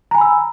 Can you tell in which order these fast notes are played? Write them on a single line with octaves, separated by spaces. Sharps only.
A#5 G#5 B5 E6